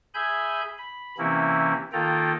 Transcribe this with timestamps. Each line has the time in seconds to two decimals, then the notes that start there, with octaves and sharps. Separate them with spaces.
0.14 G#4 E5 G#5 B5 G6
0.78 B5
1.18 C3 E3 A#3 C4 C#4 E4
1.93 D#3 A#3 F4 A4 G5 A#5